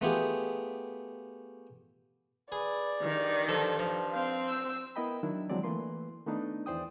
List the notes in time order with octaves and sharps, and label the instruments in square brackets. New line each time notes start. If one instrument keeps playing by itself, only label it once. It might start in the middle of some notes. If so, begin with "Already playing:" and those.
[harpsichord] A3 B3 F4 G4 G#4
[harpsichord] G#4 [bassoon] B4 [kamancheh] D5
[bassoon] G2 [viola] D#3
[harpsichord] F3 A4
F3
[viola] C4 [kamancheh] F5
[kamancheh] E6
[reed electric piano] B3 E4 A#4 D#5 G5 B5
D#3 F#3 D4 E4
D3 F3 F#3 G#3 C4 D5
E3 A3 A#3 B4 C6
D#3 A3 B3 D4 D#4
E2 E3 C5 D5 G5 D#6